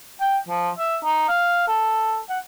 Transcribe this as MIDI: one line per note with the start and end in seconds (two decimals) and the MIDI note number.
0.21 0.37 79
0.48 0.69 53
0.78 0.97 76
1.04 1.25 63
1.28 1.67 77
1.68 2.20 69
2.29 2.39 78